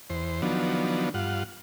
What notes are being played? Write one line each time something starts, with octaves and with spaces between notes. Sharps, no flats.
E2 C5
D#3 F3 F#3 B3 D4
G2 F4 F#5